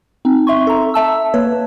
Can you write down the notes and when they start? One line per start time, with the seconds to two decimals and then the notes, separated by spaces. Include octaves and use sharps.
0.25 C4 D#4
0.47 E5 C6 C#6
0.67 A4 A#5
0.94 E5 A5 E6
1.34 A#3 B4 C#5